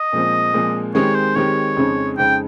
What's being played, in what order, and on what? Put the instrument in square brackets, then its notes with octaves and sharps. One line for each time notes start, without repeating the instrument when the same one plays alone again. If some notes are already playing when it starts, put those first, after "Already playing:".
Already playing: [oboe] D#5
[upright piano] A#2 F3 G#3 C4
A#2 F3 G#3 C4
[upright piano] D#3 G#3 C4 D#4 G4 [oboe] C#5
[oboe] C5
[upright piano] D#3 G#3 C4 D#4 G4 [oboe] C#5
[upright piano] F2 C#3 G#3 C4 D#4
[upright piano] F2 C#3 G#3 C4 D#4 [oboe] G5